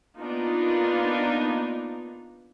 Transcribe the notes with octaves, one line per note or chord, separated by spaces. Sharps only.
A#3 B3 D4 D#4 F4